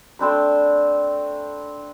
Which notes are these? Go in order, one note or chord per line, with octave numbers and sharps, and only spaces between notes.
A3 C4 D4 B5